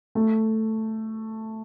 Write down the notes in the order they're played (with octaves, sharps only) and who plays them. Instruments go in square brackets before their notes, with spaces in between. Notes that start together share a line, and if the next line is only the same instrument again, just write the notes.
[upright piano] A3